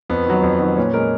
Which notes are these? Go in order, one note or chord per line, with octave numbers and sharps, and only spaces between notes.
F2 B3
D#3 F#3
F2
D#3 F#3
A#2 C#4
G#3 A#4